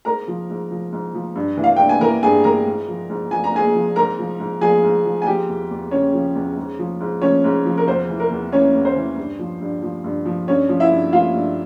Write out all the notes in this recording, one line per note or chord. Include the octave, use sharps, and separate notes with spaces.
G#2 A#4 A#5
F3
G#2
F3
G#2
F3
G2
E3
F5
G2 G5
G#5
E3 A#4 A#5
G2 G#4 G#5
E3 A#4 A#5
G#2
F3
G#2
F3 G#5
A#5
G#2 G#4 G#5
F3
G#2 A#4 A#5
F3
G#2
F3 G#4 G#5
G#2
F3
G#5
F3 G4 G5
E2
E2
C#3 C#4 C#5
F3
E2
G#2
F3
G#2
F3 C#4 C#5
G#2
F3
A#4
E2 C5
E3
A#4
E2
E3 C#4 C#5
E2
C5
E3
G2
F3
G2
F3
G2
F3
G2 C#4 C#5
F3
E4 E5
G2
F3 F4 F5
G2